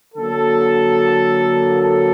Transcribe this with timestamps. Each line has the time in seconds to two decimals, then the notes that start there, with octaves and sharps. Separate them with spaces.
0.14 D3 F#3 A#3 A4
1.82 A4